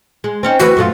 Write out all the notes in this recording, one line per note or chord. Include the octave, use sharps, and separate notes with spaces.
G#3
C4 C#4 D#4
D2 E3 F#4 B4
F#2 A3 F4